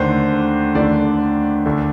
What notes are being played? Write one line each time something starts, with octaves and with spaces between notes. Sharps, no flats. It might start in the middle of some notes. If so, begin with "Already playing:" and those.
Already playing: D#2 D3 A3 C5
D#2 D3 A3 D5
D2 D3 A3